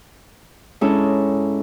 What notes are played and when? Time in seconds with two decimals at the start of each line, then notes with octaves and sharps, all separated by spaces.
0.81 G#2 G#3 C#4 D4 E4 A4